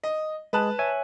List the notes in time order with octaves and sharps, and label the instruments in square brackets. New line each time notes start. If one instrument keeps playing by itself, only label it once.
[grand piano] D#5
[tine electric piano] G#3 G#4 [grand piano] B4 A5 F#6
[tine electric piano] C#5 E5 G#5